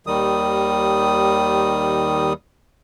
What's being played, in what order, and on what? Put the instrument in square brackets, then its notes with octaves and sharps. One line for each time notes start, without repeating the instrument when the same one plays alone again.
[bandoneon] D#2 D#3 G3 D#6